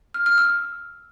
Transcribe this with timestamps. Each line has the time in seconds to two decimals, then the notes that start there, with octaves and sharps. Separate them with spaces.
0.14 F6
0.26 F6
0.38 E6